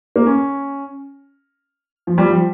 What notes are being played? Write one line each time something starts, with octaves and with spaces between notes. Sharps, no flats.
A#3
C#4
F3
G3
F3